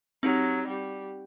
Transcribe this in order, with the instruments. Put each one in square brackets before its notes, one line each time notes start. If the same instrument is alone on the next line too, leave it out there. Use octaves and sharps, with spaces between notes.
[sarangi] F#3 [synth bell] C4 D#4 G4
[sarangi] G3